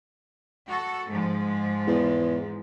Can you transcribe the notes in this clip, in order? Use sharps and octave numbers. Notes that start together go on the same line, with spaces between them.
F#4 A4
G#2 F3 G#3
E2